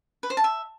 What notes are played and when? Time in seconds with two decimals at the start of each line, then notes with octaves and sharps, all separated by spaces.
0.23 B4
0.30 C5
0.37 A5
0.44 E5